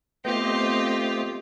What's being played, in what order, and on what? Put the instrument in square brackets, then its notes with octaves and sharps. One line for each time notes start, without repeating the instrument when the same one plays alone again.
[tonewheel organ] A3 C5 D#5 [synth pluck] B3 C4 [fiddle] F4 G4